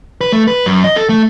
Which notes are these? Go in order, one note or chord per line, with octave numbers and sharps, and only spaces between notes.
B4
A3
B4
F#2
D#5
A4
A3